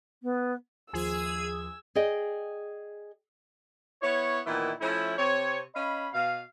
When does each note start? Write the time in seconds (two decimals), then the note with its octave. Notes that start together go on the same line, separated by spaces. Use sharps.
0.23 B3
0.93 D#2 F3 G#4 E6 G#6
1.95 G#4 D5 D#5 G5
4.02 B3 E4 C#5
4.46 A#2 D#3 E3 B3 E4
4.80 F3 A3 C#4 E4
5.18 C3 C4 C#5
5.74 C#4 D#5 F5 B5
6.13 B2 F5